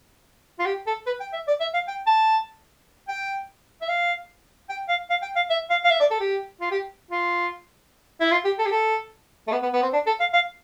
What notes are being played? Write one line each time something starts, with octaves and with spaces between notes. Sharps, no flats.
F4
G4
A4
B4
G5
E5
D5
E5
F5
G5
A5
G5
E5
F5
G5
F5
F5
G5
F5
E5
F5
F5
E5
D5
A4
G4
F4
G4
F4
E4
F4
G4
A4
G4
A4
A3
B3
B3
B3
C4
D4
A4
F5
F5